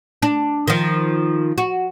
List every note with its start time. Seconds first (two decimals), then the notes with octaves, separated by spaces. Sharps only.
0.22 D4
0.67 D#3 F3
1.58 F#4